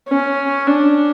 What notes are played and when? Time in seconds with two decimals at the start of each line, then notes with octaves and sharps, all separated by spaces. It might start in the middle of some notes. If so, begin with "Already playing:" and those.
0.09 C#4
0.67 D4